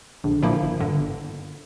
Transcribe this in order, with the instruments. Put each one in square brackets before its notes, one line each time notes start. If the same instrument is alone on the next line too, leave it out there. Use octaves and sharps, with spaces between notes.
[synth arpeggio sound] A#1 [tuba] D3
[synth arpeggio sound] A#2 F3 A#3 E4
G1
G2 D3
G1